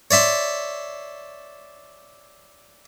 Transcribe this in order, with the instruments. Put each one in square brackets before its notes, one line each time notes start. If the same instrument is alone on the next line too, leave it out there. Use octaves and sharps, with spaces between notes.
[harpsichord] C#5 D5 E5 C6